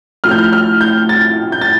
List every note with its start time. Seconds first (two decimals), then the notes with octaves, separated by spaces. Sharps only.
0.24 A2 F3 A3 F6
0.31 G6
0.38 F6
0.53 F6
0.81 G6
1.09 A6
1.52 G6
1.61 A6